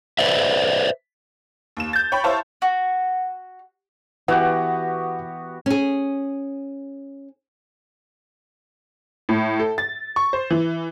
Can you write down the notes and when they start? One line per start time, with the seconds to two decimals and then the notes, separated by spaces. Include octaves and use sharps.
0.19 B4 C5 D5 E5
1.77 D#2 E7
1.93 G6 A6
2.12 C#5 G5 B5
2.24 E4 C5 C#5 F5 A5
2.62 F#4
4.28 E3 B3 F#4 G4 F#5
5.66 C#4 G#4
9.29 A2
9.59 A4
9.78 A6
10.16 C#6
10.33 C5
10.50 E3